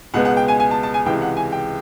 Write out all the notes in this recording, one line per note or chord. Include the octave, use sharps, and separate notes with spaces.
C#2 B2 G#3 B3 F#5
F#5
G5
G#5
G#5
A5
A5
G#5
C#2 C3 E3 G#3 G5
F#5
G#5
G5